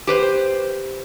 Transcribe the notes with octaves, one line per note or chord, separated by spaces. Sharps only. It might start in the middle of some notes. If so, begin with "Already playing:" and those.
G4 B4 C5